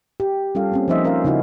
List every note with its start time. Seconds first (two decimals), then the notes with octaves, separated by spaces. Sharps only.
0.20 G4
0.55 G3 C#4 F4 A4 F5
0.72 A#3 C4 C#4
0.88 F3 A#3 D#4 C5 D#5 E5
1.04 C#4 A#4 C5 D5 F5
1.24 C#3 D#4 E4 F#4